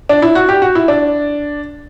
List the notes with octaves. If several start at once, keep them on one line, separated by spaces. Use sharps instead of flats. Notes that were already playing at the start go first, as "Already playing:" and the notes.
D4
E4
F#4
G4
F#4
E4
D4